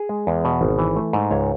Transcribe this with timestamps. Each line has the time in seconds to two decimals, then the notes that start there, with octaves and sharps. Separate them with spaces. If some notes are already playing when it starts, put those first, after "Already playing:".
Already playing: G#4
0.09 G#3
0.27 E2
0.45 B2
0.61 G#1
0.79 E3
0.96 A3
1.13 G#2
1.31 C#2 C#5